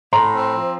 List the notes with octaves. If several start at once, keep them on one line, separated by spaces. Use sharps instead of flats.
A2 A#5 C6
C4
F3